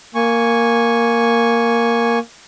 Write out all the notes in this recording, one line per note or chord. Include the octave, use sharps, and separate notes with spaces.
A#3 G#5 C#6